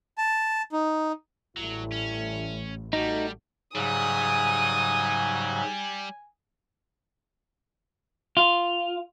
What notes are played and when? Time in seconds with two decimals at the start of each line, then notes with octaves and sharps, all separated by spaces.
0.18 A5
0.72 D#4
1.57 A1 F#3 G3 A3 E4
1.92 C#4
2.93 G3 A3 D#4 F#4
3.75 G#2 C#3 F#3 G3 G#5 D#6
8.37 F4